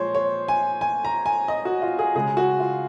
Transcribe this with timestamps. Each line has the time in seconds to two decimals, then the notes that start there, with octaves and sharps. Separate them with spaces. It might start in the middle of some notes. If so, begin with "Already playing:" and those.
Already playing: A#2 F3 G#3 C5 C#5
0.15 C#5
0.48 G#5
0.81 G#5
1.05 A#5
1.26 G#5
1.48 D#5
1.65 F#4
1.82 F4
1.99 G#4
2.15 C#3 G#3 G#4
2.37 F#4
2.60 F4